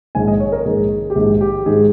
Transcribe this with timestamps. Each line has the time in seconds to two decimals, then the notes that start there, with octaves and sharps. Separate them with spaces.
0.15 A#1 G#2 D#3 G#5
0.28 D#5
0.40 C#5
0.52 A#4
0.65 A#1 G#2 D#3 G#4
1.10 G4
1.15 A#1 G#2 D#3 G#4
1.41 G4
1.66 G#2 D#3 G#4